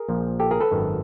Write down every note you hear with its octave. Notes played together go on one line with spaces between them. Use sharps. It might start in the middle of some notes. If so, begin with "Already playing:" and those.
Already playing: G#4 A#4
A#1 A#2 F3
G4 A4
G#4 A#4
A4 B4
G#1 F#2 D#3